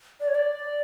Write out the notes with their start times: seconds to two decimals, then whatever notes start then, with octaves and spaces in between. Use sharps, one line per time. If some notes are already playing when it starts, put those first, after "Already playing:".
0.20 D5
0.28 C#5
0.35 D5